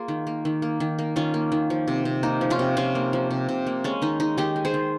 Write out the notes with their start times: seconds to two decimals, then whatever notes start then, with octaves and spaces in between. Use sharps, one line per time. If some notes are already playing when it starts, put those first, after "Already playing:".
Already playing: A#3 F4 G#4
0.08 D#3
0.27 A#3
0.45 D#3
0.62 A#3
0.80 D#3
0.99 A#3
1.16 D#3 C#4 F4
1.34 A#3
1.52 D#3
1.70 F3
1.88 C3
2.05 C3
2.23 A#3 D#4
2.41 F3
2.50 C#4 F4
2.59 C3
2.77 C3 C#4 F4
2.95 A#3
3.13 F3
3.31 C3
3.49 C3
3.67 A#3
3.84 G#3 C#4
4.02 D#3 D#4
4.20 G#3 D#4
4.37 D#3 D#4 G4
4.56 G#3
4.65 G#4 C5
4.74 D#3